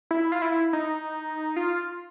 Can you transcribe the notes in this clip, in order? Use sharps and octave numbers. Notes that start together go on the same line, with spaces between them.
E4
F4
E4
E4
D#4
F4